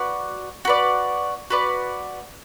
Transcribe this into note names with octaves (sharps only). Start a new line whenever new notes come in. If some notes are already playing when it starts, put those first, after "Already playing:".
Already playing: F#4 B4 D5
F#4 B4 D5
F#4 B4 D5